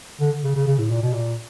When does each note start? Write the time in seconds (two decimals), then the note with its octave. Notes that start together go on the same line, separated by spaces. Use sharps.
0.21 D3
0.44 C#3
0.56 C#3
0.67 C#3
0.79 A2
0.91 A#2
1.03 B2
1.14 A#2